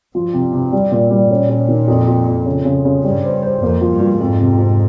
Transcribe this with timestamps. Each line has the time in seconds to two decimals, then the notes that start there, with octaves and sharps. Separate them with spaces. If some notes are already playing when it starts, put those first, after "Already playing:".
0.15 G2 F3
0.33 C3
0.53 C3
0.72 G3
0.92 A#2
1.11 G3
1.30 A#2 C#4
1.49 C#4
1.69 D#3
1.88 F2
2.08 F2
2.27 F2
2.46 C#3
2.65 C#3
2.85 C#3
3.03 G2 G3
3.24 C5
3.43 C5
3.62 F2 A#3
3.81 F3
3.91 G2
4.00 F3
4.19 F2 G#2
4.40 C3
4.58 F2